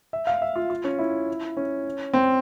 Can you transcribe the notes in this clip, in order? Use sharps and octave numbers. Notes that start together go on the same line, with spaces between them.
E5
F5
E5
F4
F4
C#4
E4
C#4
C4